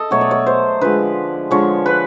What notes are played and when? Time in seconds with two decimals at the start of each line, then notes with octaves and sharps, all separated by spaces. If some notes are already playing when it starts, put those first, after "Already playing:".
Already playing: A4 D#5
0.11 B2 F#3 A3 C#5
0.21 D5
0.31 C#5
0.46 C5
0.81 D3 F3 G#3 B4
1.51 D3 F3 G#3 C#5
1.86 B4